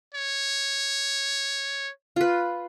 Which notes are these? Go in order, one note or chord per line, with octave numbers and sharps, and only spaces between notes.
C#5
F4 B4